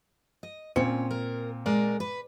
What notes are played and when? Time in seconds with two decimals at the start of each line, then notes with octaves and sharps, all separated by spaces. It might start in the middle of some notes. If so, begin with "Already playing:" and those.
0.43 D#5
0.76 A#2 C4 C#4 C#7
1.11 A#4
1.66 G#3 A#4 D5
2.00 B4